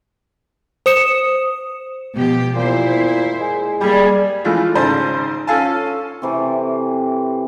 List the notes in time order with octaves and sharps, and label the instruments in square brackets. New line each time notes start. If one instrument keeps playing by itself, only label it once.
[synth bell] C5 D#6 C#7 E7
[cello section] B2 F3 G4
[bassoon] A#2 [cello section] E4 C5
[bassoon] G#3
[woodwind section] G3 [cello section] A#3 G#4
[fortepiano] E3 F3 G#3 A3 F4
G#1 C#3 G#4 C5 A5
C#4 F4 A4 F5 G#5 A5
[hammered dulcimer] C3 E3 A3 C4